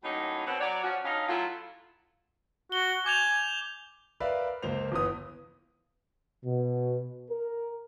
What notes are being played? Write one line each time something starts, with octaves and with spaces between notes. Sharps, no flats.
A2 F#3 A#3 C#4 D#4
B2 C4 C#4 F#5
F#3 C#5 D5
F3 C#4 F#4
G2 C#4 D#4 F5
F#3 A3 E4 F4
F#4 G7
G#5 D6 G6 F7
A#4 B4 D5 E5 F5
C#2 A#3 C5 F7
G1 E3 B3 D#6
B2
A#4